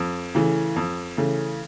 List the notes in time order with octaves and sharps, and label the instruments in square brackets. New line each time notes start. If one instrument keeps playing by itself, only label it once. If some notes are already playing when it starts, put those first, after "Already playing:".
Already playing: [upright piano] F2
C#3 E3 A3
F2
C#3 E3 A3